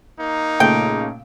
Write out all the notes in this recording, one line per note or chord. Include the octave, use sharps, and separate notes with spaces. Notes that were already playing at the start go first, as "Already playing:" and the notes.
A#3 D#4
A#2 C#3 A3 G5